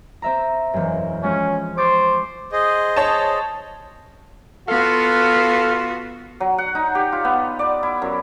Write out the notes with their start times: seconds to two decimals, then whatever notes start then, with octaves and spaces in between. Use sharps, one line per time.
0.22 C4 E5 A#5
0.74 E1 F#2
1.22 F3 G#3 C#4
1.77 C5 C#6 D6 A6
2.52 G#4 C5 D#5
2.96 C#5 A5
4.68 B3 F4 F#4 A4 F5
6.40 F#3
6.58 F#5
6.75 D#4
6.95 G4
7.12 F4
7.25 B3
7.59 D5
7.83 E4
8.02 F#2